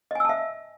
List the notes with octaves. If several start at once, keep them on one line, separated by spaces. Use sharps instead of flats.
D#5 E5 G#5 A5 E6